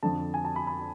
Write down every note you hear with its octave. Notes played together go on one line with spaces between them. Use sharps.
F2 D3 F3 A5
G#5
A5
B5
B5